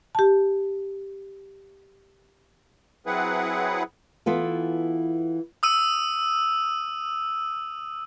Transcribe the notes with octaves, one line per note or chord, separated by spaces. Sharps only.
G4 A5
F#3 C4 E4 G#4 B4 F#5
E3 B3 F4 A4
D#6 E6 D#7